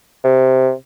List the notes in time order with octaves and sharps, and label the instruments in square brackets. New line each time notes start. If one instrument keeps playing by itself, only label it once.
[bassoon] C3